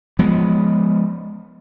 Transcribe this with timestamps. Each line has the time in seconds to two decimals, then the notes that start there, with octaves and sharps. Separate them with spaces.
0.19 F3 G#3 B3